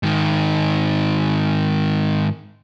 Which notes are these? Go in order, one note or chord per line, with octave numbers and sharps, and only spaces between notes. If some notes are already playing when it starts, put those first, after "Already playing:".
G#2 D#3